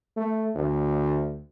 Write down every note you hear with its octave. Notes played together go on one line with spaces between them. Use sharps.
A3
D2